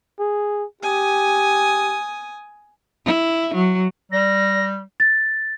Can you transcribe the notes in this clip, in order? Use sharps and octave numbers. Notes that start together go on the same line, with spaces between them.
G#4
G4 G#5 D#6
E4
F#3
G3 D5 A#6
A6